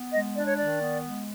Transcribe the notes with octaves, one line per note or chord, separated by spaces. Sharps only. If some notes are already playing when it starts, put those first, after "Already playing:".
Already playing: B3
G#3 D#5
D4 D5
C#5
D#3 D5
B3
G#3